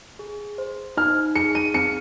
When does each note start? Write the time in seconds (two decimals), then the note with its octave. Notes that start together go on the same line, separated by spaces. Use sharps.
0.19 G#4
0.58 C5
0.97 D#4 F6
1.35 G#4 C#7
1.55 D#7
1.74 C4 C#7